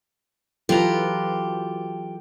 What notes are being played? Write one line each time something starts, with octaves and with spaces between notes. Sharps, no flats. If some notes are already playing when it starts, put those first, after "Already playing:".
E3 F#3 F4 G4 A4 B4 A#5